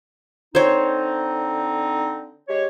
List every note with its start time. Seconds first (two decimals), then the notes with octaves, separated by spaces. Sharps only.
0.55 D3 C4 D#4 C5 C#5
2.48 G#3 G4 C#5